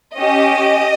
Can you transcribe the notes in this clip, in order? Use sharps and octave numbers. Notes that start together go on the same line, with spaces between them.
C#4 G4 D#5